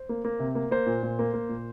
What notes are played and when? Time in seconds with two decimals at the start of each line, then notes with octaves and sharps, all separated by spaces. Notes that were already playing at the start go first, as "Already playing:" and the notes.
Already playing: C5
0.09 A#3
0.25 A#3
0.40 C3
0.55 A#3
0.71 A#3 C5
0.86 A#2
1.03 A#2
1.19 A#3
1.34 A#3
1.49 A#2